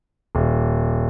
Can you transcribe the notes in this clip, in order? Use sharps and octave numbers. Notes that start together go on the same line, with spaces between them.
D#1